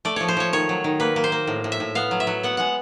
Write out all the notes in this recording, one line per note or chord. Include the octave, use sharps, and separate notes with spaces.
A3 D5
F3 C#5
C5
F3 C#5
D#3 C#5
F#3
D#3
A#3 B4
A#3
C5
A#3
A2
A2
E5
A2
B3 F5
F#3
E5
F#3
B3 F#5
G#3 F#5